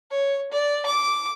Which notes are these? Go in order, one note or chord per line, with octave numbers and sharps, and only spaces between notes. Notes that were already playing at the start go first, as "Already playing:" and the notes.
C#5
D5
D6